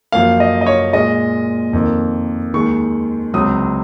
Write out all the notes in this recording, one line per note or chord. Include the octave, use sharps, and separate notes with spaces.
F#2 F3 A#3 F5
D#5
D#5
C#5
A#2 G#3 D#5
F2 D#3 A#3
D#2 D#3 G#3 C#6
C#2 C3 F#3 D#6